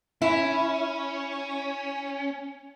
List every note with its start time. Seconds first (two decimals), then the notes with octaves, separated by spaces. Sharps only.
0.22 C#4 E4